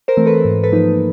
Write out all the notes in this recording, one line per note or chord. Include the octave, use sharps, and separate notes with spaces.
A#4 C5
E3 A3 C4
A4 B4
G#2
A4 B4
F3 A#3 D#4